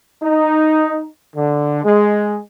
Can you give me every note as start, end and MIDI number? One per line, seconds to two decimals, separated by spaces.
0.23 1.08 63
1.36 1.82 50
1.84 2.40 56